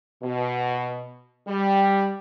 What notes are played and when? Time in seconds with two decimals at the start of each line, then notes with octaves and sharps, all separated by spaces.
0.23 B2
1.48 G3